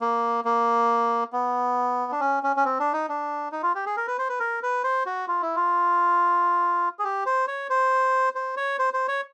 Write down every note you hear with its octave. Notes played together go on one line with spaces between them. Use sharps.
A#3
A#3
B3
D4
C#4
C#4
C#4
C4
D4
D#4
D4
D#4
F4
G4
G#4
A#4
B4
C5
B4
A#4
B4
C5
F#4
F4
E4
F4
G#4
G4
C5
C#5
C5
C5
C#5
C5
C5
C#5